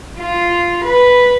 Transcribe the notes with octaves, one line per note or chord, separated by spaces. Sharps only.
F4
B4